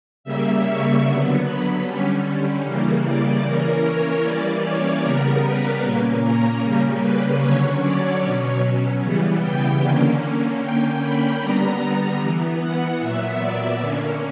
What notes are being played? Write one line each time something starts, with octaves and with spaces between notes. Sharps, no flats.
C#3 G3 A#3 E5
C#6
D3 F#3 B3
B5
D3 G3 C#4
C#3 E3 G3 A#3
D5
E3 A#3 C#4 A#4
C#5
E3 G3 A#3 C#4 D5
C#5
C#3 G3 B3 A#4
B4
A#2 A#3 C#4
A#4
C#3 G3 A#3 C#4
B4
D3 F#3 C#4 C#5
D5
B2 F#3 C#4
C#3 E3 G3 B3
G5
D3 A#3 C#4
D3 A#3 C#4 G5
B5
D3 G3 B3 A#5
E3 B3
F#5
A#2 F#3 B3 E5
D5
D3 A#3 C#4